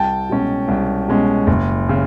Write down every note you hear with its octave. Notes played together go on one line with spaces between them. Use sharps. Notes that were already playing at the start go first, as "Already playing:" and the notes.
Already playing: C2 G5 A5
B2 G#3 C#4
C2
B2 G#3 C#4
F#1
C#3